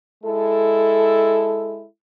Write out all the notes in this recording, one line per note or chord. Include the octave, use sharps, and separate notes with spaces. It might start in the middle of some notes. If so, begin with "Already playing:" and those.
G#3 E4 A4